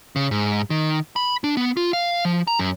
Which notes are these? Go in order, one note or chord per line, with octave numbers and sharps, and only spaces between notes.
C#3
G#2
D#3
B5
D4
B3
F4
F5
F3
A#5
F#2